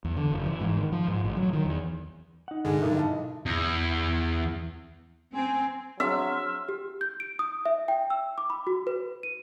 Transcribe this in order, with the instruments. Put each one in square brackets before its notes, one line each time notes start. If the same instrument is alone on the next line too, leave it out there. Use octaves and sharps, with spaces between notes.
[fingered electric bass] E2
D3
F#1
E3
G#2
D#3
F3
G#2
A1
F#3
D#3
E2
[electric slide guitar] D#4 F#5
[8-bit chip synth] G2 D3 [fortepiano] G#3
[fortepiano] B1 [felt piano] D#4 A#4 [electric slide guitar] E4
[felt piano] D#5 F5 A5
[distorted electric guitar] E2
[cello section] C4 [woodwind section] G#5
[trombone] F#3 [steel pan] C4 D4 G#4 [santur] E5 [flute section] C6 F6
[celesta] G4
G6
D7
D#6
E5
G5
E6
D6
B5
F#4
B4
D#7